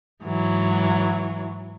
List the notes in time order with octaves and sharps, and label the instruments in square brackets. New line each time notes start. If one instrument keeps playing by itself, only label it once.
[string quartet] G#2 E3 F#3